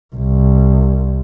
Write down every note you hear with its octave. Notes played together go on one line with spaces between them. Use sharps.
C2